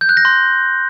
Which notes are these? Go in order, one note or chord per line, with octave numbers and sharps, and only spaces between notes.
G6
F#6
A#6
C6